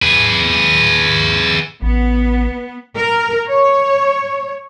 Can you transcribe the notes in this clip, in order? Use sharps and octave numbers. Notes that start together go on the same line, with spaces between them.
G#4 B4
A1 B3
A#4
C#5